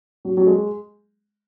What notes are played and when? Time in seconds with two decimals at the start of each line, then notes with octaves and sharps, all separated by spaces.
0.25 F#3
0.37 F#3
0.47 G#3